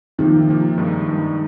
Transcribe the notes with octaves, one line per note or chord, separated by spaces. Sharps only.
C3 D#3 F3 A#3
C3 F3 A#3
G2 D#3 G#3 D#4
G2 D#3 G#3 D#4